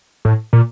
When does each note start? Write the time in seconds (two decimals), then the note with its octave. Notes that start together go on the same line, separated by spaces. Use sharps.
0.25 A2
0.53 A#2